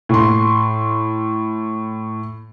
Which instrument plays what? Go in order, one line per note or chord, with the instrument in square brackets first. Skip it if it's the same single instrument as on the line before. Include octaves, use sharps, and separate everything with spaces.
[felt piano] A2 C6